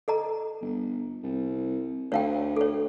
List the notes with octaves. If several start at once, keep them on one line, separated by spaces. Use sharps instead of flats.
A4 D#5 A#5
G1
C2
D2 C#5 F5 G5
A4 C#5